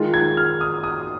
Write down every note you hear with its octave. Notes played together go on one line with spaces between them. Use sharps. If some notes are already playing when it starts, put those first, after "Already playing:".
Already playing: D#3 G#3 F4
G#6
F6
D#6
D#6